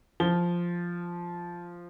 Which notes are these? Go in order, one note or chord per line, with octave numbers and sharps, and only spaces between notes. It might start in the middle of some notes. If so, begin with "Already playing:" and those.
F3 G7